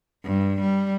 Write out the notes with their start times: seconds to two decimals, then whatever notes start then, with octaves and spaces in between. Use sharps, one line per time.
0.25 G2
0.62 G3